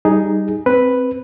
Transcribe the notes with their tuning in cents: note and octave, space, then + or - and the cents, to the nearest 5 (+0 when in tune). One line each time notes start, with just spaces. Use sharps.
G3 +0 D#4 +0 G#4 +0
C4 +0 B4 +0